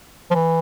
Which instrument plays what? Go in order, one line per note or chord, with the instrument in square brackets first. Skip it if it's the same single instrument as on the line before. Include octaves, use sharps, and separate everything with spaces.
[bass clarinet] F3
E3